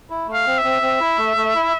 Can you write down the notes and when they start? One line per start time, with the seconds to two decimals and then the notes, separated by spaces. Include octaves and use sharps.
0.10 E4
0.28 A3
0.33 F5
0.46 C4
0.58 E5
0.64 C4
0.82 C4
1.00 E4
1.18 A3
1.37 A3
1.55 E4